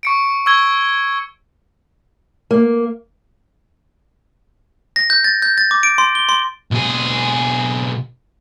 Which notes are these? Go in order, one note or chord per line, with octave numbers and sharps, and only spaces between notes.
C#6 C#7 D7
C#6 E6 G#6 G7
A#3
A#6
G6
A6
G6
A6
D6
D7
C6
G7
C6
B1 G#4